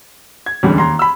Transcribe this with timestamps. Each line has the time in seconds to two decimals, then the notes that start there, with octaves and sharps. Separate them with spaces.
0.46 G#6
0.63 E2 D3 G3 G#3 C#4
0.78 D#2 A#5 C6
0.99 B5 E6